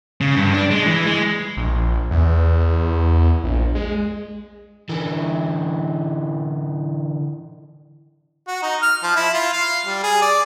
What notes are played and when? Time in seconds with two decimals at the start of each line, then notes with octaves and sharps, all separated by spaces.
0.21 C#3
0.36 G2
0.54 D4
0.71 G#3
0.86 E3
1.06 G#3
1.57 A#1
2.11 E2
3.44 A#1
3.75 G#3
4.90 D3 E3
8.47 F#4
8.63 D#4
8.82 F6
9.03 F3
9.16 E4
9.34 F4
9.53 F5
9.86 G3
10.04 G#4
10.22 D5